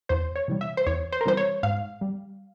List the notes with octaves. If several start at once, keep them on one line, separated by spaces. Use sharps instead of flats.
E2 C5
C#5
C3 E3 G3
E5
C5
E2 C#5
C5
A#4
C3 E3 G3 C5
C#5
G#2 F5
G3